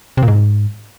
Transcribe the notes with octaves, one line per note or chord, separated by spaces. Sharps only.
C3
A#2
G#2